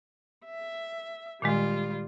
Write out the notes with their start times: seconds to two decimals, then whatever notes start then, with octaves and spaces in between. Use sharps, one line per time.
0.46 E5
1.42 A#2 D#3 G3 G#3 F4